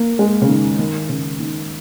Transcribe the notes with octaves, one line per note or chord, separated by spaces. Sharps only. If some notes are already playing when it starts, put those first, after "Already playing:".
Already playing: A#3
G#3
C#3
D#3
D#3
C#3
D#3